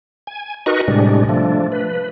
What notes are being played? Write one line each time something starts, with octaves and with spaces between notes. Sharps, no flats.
G#5
D#4 F#4 A#4 B4 D#5 C#6
A2 C3 G3 G#3 D4
F3 A3 D4
B4